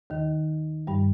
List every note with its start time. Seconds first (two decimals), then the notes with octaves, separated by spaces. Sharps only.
0.10 D#2 D#3
0.87 G2 G3